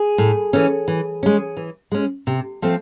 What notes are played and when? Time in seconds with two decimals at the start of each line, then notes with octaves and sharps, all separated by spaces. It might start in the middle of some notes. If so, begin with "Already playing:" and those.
Already playing: G#4
0.18 A2
0.53 E3 A3 C#4
0.88 E3
1.23 G#3 C#4
1.57 E3
1.92 G#3 C#4
2.27 C3
2.62 F3 A3 C4